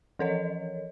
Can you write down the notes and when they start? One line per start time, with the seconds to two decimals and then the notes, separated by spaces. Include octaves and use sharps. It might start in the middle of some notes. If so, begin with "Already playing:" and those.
0.19 E3 F3 A4 A#4 C#5 D#5